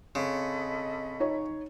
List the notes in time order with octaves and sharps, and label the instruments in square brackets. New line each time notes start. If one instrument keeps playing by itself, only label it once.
[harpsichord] C#3 [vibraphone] C4 [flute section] A4 D#5 B5
[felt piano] D#4 C#5